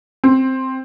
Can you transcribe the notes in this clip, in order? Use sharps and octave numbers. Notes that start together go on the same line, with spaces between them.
C4